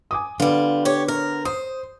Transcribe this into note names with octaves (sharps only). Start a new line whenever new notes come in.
G#5 D6 D#6
D3 G3 B3 F4
G4 C#5
A#4
C5 D#6